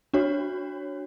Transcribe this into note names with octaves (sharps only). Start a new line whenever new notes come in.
D4 F#4 C#5